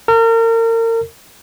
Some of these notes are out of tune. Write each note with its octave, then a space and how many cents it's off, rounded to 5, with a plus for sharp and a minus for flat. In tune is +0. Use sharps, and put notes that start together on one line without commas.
A#4 -35